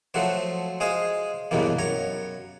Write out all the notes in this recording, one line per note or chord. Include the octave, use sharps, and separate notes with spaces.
F3 F#3 A3 F#4 C5
G#3 G#4 C5 F5
B1 E2 G2 B2 E3 A#3
F#2 C#5 A#5